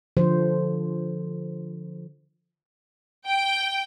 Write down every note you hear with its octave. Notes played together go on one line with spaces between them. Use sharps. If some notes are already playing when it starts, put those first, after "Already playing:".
D3 F3 C5
G5